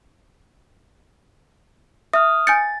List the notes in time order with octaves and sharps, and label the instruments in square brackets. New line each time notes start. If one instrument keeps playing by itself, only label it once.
[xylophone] E5 [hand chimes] D#6 F6
[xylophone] G#5 G6 C#7 [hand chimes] A6